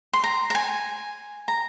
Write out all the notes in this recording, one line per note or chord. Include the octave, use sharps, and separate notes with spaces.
C6
A#5
A#5
G#5
A#5